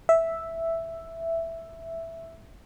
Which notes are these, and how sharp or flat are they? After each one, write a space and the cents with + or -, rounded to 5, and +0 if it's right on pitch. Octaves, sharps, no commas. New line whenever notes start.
E5 +0